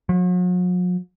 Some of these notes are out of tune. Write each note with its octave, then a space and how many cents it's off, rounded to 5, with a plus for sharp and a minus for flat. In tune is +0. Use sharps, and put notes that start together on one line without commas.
F#3 -45